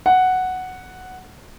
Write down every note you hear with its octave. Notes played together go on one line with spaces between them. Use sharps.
F#5